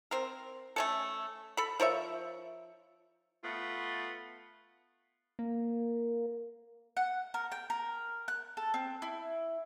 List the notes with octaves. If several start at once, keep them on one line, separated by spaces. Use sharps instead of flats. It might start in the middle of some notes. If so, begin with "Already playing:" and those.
C4 A#4
A3 C#4 A4
A4 B5
F3 A#4 C#5 E5
A3 B3 F4 B4
A#3
F#5
A#4
G5
A#4
F#6
A4
C4
E4